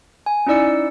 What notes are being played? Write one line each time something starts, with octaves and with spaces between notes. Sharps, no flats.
G#5
C#4 D#4 E4 D5 E6 C#7